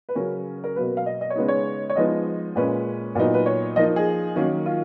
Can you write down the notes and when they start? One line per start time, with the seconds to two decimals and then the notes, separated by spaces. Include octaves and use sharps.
0.09 B4
0.15 C#3 F#3 C#4 A#4
0.64 A#4
0.76 B2 F#3 A#3 B4
0.97 F5
1.06 D#5
1.21 D#5
1.30 C#5
1.36 C#3 G#3 B3 D#4 B4
1.48 C#5
1.90 C#5
1.96 F3 G#3 B3 D#4 D#5
2.56 A#2 G#3 C#4 B4
3.15 A#2 F#3 B3 D#4
3.34 B4
3.46 C#5
3.76 F3 A#3 D#4 D#5
3.96 G#4
4.36 D#3 F#3 A#3 C#4
4.66 F4